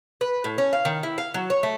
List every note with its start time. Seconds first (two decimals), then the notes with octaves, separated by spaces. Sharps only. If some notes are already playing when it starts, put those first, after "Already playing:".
0.21 B4
0.44 A2
0.58 C#4
0.73 F5
0.85 D#3
1.03 E4
1.18 F5
1.34 F#3
1.50 C#5
1.63 A3